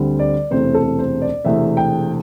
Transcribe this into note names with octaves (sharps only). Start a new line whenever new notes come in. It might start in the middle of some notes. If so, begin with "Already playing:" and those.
Already playing: D2 D3 G3 C4
D5
E1 E2 C3 A3 C4 C5
A4
C5
D5
E1 E2 C3 A3 C4 E5
G5